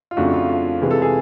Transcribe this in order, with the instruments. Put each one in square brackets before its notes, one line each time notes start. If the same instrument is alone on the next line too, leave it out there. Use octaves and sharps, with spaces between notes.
[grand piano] F4
F2 C#3 F3 A3 D4 F#4
F4
F4
C3 E3 G#3
A4
G#4